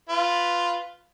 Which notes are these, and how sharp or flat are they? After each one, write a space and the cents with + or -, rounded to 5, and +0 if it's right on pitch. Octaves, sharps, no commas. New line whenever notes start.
F4 +0 B4 +0